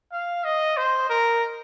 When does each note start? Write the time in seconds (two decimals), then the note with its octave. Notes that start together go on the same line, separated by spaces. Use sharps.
0.12 F5
0.44 D#5
0.77 C5
1.10 A#4